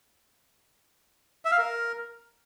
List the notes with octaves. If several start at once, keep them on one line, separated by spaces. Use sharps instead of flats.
E5
F5
A#4